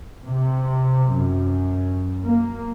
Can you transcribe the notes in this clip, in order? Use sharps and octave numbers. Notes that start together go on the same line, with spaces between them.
C3
F#2
A#3